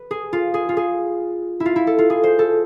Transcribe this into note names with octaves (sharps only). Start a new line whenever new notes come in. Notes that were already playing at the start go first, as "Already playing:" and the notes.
Already playing: B4
G#4
F4
G#4
F4
G#4
E4
F4
E4
A4
F4
G#4
C5
A4